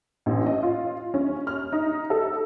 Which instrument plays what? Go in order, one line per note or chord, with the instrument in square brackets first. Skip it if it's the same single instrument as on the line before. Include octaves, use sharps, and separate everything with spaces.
[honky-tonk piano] A1
D#5
F4
C#4
F6
D#4
A4